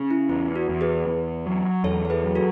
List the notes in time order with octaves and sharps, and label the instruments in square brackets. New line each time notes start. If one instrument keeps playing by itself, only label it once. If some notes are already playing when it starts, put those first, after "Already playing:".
Already playing: [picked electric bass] C#3
[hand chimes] E4
[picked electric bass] E2 [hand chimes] E4
[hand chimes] F#4
[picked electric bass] E2
[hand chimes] G#4 B4
[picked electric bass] E2
F#3
[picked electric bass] E2 [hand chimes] A4 C#5
[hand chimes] C#5
G#4 B4
[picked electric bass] F#3
[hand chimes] F#4 A4